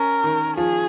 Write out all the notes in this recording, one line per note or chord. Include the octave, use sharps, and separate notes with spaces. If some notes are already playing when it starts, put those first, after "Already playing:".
Already playing: C#4 A#4
D#3
F3 G#4